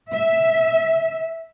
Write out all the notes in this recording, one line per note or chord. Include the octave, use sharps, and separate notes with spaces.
E5